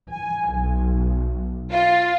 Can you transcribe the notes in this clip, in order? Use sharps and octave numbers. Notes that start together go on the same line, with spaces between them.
G#5
B1
F4